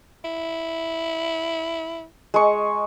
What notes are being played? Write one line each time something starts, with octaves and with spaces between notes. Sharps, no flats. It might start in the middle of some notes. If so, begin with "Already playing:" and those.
E4
G#3 C#6